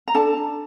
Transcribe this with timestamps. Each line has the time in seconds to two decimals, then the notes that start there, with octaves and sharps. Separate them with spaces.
0.08 A#5
0.14 D4 A4 A5
0.37 D4